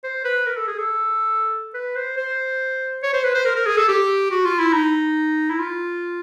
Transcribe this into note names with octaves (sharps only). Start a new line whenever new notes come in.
C5
B4
A#4
A4
G#4
A4
B4
C5
C5
C#5
C5
B4
C5
A#4
A#4
G#4
A4
G4
F#4
F4
E4
D#4
E4
F4